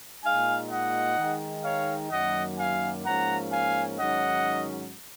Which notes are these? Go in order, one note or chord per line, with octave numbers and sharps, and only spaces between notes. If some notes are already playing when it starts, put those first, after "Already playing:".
A#2 G#3 D#4 F5 G#5
D#5 F#5
D#3 G#3 D#4
C#5 F5
F#2 D#3 F#3 A#3 D#5 F#5
F5 G#5
G#2 F3 A#3 C#4 F#5 A#5
F5 G#5
G#2 D#3 F#3 C#4 D#5 F#5